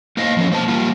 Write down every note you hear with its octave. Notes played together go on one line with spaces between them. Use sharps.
A#3 C5 D#5 F5
F3 C4 C#4
A#3 C5 A5
G3 A#3 F4